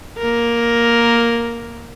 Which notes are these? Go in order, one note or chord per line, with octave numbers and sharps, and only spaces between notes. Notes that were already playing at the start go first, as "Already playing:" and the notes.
A#3 A#4